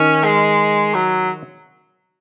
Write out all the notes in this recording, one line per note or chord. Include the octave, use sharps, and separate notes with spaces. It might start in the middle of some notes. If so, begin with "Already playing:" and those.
Already playing: D#3 C#4
G#3
F#3